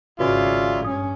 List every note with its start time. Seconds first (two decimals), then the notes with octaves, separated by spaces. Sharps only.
0.20 G#1 C#3 F4 F#4 B4 C#5 D5 E5
0.84 G2 C#4 D#6